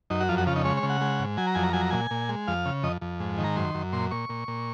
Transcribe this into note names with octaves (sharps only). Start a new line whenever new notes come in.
F#2 D#4
F#4
F2 F4
F#4
C#3 F4
D#4
G#3 C#5
C#5
C#3
F#5
G#3
G#2
F#3 G#5
A#5
F2 G#5
A#5
F#3 G#5
A#5
A#2 G#5
A#2
G#3
F2 F5
C#3
F2 D#5
F2
G#2
D#3
A#5
F#2 C6
F#2
A#2 C6
A#2 C#6
A#2
A#2